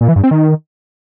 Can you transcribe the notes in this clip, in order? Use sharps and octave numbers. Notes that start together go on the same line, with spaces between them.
A#2
E3
G2
C4
D#3